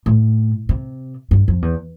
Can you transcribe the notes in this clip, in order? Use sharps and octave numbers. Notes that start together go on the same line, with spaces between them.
A2
C3
G2
F2
E2